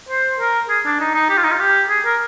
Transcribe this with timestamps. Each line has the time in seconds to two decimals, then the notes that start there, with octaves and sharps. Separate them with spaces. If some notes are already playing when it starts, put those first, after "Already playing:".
0.09 C5
0.39 A#4
0.69 G#4
0.85 D4
1.00 D#4
1.15 D#4
1.29 G4
1.37 F4
1.44 D#4
1.52 F4
1.60 G4
1.89 G#4
2.05 A#4